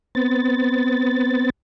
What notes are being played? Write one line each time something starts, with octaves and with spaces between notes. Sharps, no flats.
B3 C4 A6